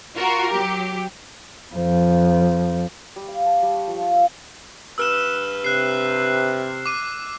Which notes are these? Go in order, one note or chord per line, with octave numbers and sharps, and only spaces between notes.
F4 F#4 A#4
F#3 G4
F2 F3
G3
F5
A5
G3
C#6
F3
F4
E5
G2 B4 E6 F6 E7
C3 F#6 C7
D6 D#7